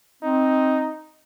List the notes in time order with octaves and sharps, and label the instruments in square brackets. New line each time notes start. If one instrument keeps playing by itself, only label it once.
[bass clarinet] C4 [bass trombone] D#4